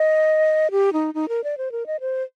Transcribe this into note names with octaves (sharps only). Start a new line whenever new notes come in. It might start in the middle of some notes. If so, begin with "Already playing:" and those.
Already playing: D#5
G4
D#4
D#4
A#4
D5
C5
A#4
D#5
C5